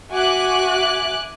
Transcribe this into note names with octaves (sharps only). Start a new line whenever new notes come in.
F#4 E5 G#5 D6 F#6